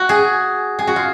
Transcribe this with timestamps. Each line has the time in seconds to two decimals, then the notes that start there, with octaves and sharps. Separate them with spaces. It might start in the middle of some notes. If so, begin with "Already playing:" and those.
Already playing: F#4
0.09 G#4
0.79 G#4
0.87 F#4
0.96 F4